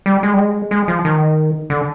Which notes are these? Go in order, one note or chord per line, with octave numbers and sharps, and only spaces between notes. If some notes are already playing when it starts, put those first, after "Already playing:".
G3
G#3
G3
G#3
G#3
F3
D#3
D3